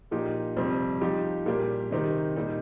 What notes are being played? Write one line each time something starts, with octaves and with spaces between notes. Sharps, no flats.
A#2 F3 D#4 G4
F2 C3 G3 C4
F3 D#4 G4
A#2 G3 A#3 G4
C3 D#3 C4 D#4 G4
A#2 G3 D#4